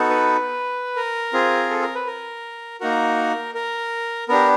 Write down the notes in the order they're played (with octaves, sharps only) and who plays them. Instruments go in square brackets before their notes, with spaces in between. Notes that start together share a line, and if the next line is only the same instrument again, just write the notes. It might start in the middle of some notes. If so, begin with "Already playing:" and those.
Already playing: [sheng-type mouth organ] B3 D#4 F#4 A4
B4
A#4
C4 F4 G#4
A4
A#4
B4
A#4
A#3 D#4 F#4 A#4
A#4
B3 D4 G4 A#4